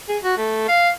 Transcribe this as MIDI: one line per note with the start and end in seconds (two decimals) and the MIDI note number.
0.09 0.18 68
0.23 0.35 66
0.37 0.66 57
0.68 0.90 77